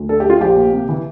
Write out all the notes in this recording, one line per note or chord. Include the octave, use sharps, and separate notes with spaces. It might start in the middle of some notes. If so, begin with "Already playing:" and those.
Already playing: D2
D4 A4
G4
G3
F4
A#1 G4
A#2
C3
E3